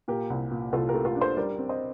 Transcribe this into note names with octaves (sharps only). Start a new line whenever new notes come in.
A#2 G4 A#4
C2
A#2
C2 F4 A4
G4 A#4
A3
F4 A4
D4
A4 C5
G3 A#4 D5
C4
C5 D#5